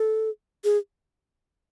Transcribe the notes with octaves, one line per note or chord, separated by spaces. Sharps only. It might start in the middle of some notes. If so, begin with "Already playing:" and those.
Already playing: A4
G#4